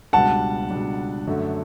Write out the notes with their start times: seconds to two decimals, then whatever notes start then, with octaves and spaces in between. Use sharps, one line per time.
0.13 C#2 B2 G3 D4 F#5 A5
0.70 C#2 B2 G3 D4
1.27 F#2 D3 A3